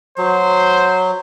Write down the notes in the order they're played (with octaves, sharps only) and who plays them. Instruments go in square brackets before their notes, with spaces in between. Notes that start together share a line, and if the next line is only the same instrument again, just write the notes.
[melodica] F#3 [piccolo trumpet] C5